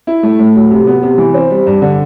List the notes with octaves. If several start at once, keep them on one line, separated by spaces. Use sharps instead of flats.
E4
A3
A2
F#3
C3
B3
C3
E3
C4
G3
G2
D3